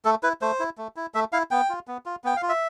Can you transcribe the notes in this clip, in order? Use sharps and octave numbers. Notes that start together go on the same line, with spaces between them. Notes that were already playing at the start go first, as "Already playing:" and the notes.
A3 A4
E4 B4
A3 C5
E4
A3
E4
A3 E5
E4 F5
B3 G5
F4
B3
F4
B3 G5
F5
F4
E5